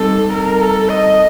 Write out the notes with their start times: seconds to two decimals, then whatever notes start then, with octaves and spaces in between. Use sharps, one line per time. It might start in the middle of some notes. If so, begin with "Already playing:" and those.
Already playing: G3 C4 D#4 G4 A4
0.33 A#4
0.61 A4
0.89 D#5